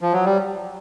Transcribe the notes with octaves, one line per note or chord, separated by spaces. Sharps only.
F3
F#3
G3